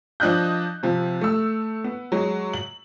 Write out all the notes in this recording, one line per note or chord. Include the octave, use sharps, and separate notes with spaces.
F3 D4 D#5 F#6 G6
C3 F3
A3 E6
B3
F#3 G#3
F#7